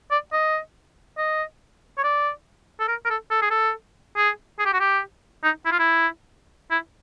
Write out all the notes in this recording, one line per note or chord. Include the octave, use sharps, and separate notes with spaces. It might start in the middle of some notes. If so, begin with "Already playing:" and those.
D5
D#5
D#5
C#5
D5
A4
A#4
A#4
A4
A4
G#4
A4
G#4
G#4
G4
F#4
G4
D#4
E4
F4
E4
E4